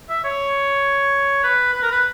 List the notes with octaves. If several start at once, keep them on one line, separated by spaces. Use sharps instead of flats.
E5
C#5
B4
B4
A#4
B4